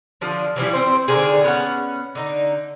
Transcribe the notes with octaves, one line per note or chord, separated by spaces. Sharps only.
D3 F3 D4
E3 F3 G3 E4
C4 C5
D3 D#3 G#4
B3 C#4 F#5
D3 D#4